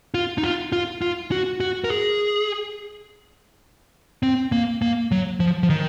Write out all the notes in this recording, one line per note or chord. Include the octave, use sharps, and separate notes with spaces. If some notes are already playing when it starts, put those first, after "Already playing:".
F4
D#4
F4
F4
F4
F#4
F#4
A#4
G#4
C4
A#3
A#3
F#3
F3
F3
D#3